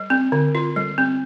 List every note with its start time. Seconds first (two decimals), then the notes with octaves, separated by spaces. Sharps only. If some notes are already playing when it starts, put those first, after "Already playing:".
Already playing: G3
0.10 C4
0.32 D3
0.55 F4
0.76 G3
0.98 C4